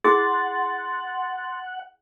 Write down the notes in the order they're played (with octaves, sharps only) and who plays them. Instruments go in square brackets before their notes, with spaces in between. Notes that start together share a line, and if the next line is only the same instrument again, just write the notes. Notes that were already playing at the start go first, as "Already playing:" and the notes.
[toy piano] E4 G#4 [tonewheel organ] F#5 [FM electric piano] C6 A6